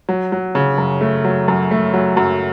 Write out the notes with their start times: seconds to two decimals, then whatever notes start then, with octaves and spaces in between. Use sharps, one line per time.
0.09 F#3
0.32 F#3
0.55 C#3
0.78 F#2
1.01 A3
1.25 F#3
1.48 F#2
1.71 A3
1.94 F#3
2.17 F#2